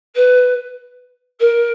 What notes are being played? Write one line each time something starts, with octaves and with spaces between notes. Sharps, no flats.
B4
A#4